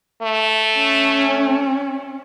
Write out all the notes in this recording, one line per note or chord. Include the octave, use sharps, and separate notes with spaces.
A3
C#4